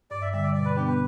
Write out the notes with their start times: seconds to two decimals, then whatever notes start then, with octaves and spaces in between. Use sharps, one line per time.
0.11 G2 D5
0.22 E5
0.33 D3 G3 E5
0.43 D5
0.54 B2 D5
0.65 B4
0.76 B3 D4 G4
0.87 B4